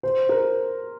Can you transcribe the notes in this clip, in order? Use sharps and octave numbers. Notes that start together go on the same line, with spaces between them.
C5
A#4